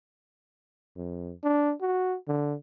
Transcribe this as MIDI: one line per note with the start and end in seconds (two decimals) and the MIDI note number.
0.97 1.34 41
1.44 1.73 62
1.81 2.16 66
2.28 2.55 50